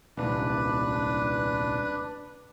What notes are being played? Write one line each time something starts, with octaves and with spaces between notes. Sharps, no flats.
D#1 C2 D4 B4